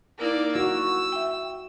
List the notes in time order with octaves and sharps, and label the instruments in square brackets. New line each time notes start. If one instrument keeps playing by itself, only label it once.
[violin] A#3 D5 [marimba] D#4 E4 A#4
[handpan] F#4 [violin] E6
[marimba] E5 G5